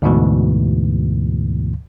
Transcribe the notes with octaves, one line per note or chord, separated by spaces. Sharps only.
D2 G#2 B2 E3